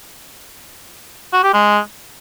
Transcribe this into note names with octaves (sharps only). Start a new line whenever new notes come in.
F#4
G4
G#3